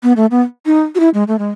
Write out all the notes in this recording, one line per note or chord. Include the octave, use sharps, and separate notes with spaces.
B3
A3
B3
D#4
F#4
E4
G#3
A3
G#3